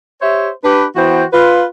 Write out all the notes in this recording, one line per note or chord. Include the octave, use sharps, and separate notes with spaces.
G4 C5 C#5 E5
D4 G4 B4
E3 B3 F#4 C5 G5
F4 B4